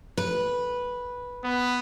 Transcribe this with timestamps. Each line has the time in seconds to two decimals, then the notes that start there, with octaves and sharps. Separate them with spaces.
0.18 B4
1.44 B3